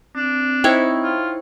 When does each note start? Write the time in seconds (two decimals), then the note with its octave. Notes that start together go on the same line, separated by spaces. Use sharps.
0.16 C4 D4
0.64 D#4 E4 C5 C#5 G5
1.03 F4